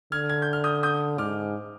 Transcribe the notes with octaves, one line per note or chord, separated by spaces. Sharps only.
D3 F6 G#6
G#6
G6
F6
D#6 G6
D#6 G6
G#2 D6 F6